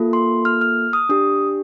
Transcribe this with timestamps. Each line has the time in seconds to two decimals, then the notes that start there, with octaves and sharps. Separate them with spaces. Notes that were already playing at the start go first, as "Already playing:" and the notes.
Already playing: A#3 F4 A4
0.13 C6
0.45 F6
0.61 F6
0.93 D#6
1.09 D4 G4 D#6